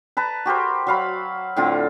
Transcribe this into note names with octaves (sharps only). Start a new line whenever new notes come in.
B4 A5 A#5
F#4 G4 A#4 C5
F#3 F5 B5
A2 D3 C4 F4